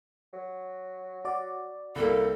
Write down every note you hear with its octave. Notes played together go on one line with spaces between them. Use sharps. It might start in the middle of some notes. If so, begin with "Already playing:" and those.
F#3
F#4 D5
C2 G3 A#3 A4